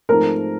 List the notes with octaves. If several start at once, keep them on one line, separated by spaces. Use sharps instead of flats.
G#2 F3 A3 C4 A#4